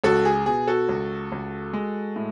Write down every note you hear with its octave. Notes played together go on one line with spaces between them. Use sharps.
C#2 F#4 A4
G#4
B2 G#4
F#4 A4
C#2
C#2
G#3
A2